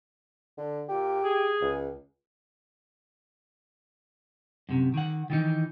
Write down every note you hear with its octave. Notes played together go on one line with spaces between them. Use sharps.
D3
A#2 G4
G#4
C#2
F#2 C3
D#3 F#5
D#3 E3 D#4